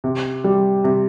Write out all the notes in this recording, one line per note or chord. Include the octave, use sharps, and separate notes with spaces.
C3
G3
C3